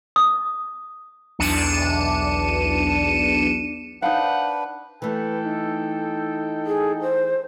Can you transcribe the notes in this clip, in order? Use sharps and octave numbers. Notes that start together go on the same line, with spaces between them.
D#6
B1 E2 D4 C#7 D#7 E7
D4 D#4 B4 C5 F5 F#5
E3 A3 A4 B4 G5
D#4
G#4
C5